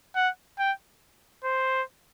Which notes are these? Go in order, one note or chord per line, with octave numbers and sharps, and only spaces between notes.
F#5
G5
C5